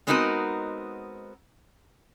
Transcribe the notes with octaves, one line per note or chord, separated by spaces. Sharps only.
G#3 B3 C4 D#4 F#4 A#4